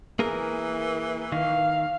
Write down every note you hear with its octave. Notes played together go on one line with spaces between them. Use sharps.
E3 A#3 G#4 A#4
D#3 F5